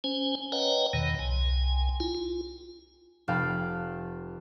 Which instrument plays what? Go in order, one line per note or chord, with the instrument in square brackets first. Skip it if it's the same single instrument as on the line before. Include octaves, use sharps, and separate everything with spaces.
[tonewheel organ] C#4 C5 G#5
B4 C#5 D#5 F#5 G5 A#5
E2 B2 D#3
C2 G#5
E4 F4
F4
[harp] F1 F5 G5 A5 B5